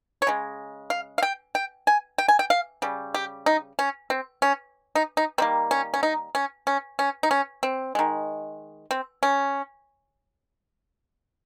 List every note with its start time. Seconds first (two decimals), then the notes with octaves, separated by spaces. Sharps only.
0.22 C#5
0.27 C#3 G#3
0.90 F5
1.18 F5
1.23 G5
1.55 G5
1.87 G#5
2.18 G5
2.28 G#5
2.39 G5
2.50 F5
2.82 C#3 G3
3.14 G4
3.46 D#4
3.79 C#4
4.10 C4
4.42 C#4
4.95 D#4
5.17 D#4
5.38 D#3 G3 A#3 C4
5.71 C#4
5.94 C#4
6.03 D#4
6.35 C#4
6.67 C#4
6.99 C#4
7.23 D#4
7.31 C#4
7.63 C4
7.95 D#3 G#3
8.91 C4
9.23 C#4